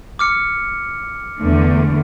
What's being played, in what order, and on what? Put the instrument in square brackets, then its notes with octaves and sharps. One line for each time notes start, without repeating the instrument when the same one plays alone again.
[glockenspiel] D6 F6 C#7
[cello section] E2 D3 A3